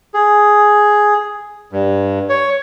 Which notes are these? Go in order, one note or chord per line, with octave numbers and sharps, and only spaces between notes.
G#4
G2
C#5